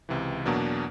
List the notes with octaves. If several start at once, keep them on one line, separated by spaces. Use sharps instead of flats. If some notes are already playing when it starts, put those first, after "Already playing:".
C#2 C3 E3
E2 B2 F#3 A#3 D4